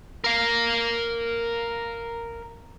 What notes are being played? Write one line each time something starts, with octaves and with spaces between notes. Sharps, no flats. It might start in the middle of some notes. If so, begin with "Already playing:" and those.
A#4 F5